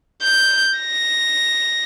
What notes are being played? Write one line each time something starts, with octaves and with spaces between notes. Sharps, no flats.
G6
A#6